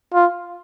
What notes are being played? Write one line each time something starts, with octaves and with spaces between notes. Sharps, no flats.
F4